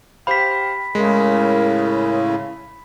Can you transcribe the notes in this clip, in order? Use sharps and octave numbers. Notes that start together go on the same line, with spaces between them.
G4 C5 F5 G5 B5 B6
A2 C#3 G#3 A#4